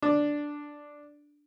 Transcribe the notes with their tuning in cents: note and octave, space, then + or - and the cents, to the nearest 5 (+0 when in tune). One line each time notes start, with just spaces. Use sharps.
D4 +0 D5 +0